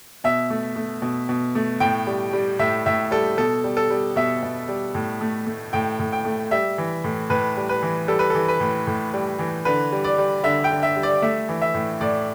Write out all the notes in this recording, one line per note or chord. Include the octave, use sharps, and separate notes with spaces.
B2 E5
A3
A3
B2
B2
A3
A2 G5
G3
G3
A2 E5
A2 E5
G3 A4
B2 A4
G3
A4
G3
B2 E5
B2
G3
A2
A3
A3
A2 G5
A2
G5
A3
G3 E5
E3
A2
A2 B4
G3
B4
E3
G3 A4
B4
E3 A4
B4
A2
A2
G3
E3
D3 B4
G3
D5
G3
D3 E5
G5
D3
E5
G3
D5
A3 E5
E3
E5
A2
A2 D5